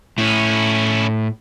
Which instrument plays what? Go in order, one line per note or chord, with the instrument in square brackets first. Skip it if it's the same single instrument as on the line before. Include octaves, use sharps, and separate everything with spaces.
[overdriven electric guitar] A2 [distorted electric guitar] C#4 E4